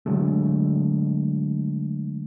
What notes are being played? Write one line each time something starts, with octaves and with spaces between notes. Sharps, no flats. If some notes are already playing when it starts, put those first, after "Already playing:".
D3 F#3 G#3 A3